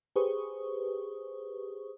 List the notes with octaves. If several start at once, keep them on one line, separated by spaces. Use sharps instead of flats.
G4 G#4 B4 C5 C#6 D#6